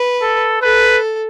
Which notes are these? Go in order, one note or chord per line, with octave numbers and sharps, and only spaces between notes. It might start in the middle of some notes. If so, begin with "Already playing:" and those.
Already playing: B4
A4
A4 B4